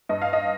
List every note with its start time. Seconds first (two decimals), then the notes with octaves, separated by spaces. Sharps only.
0.09 G2 D#5
0.22 F5
0.33 D#5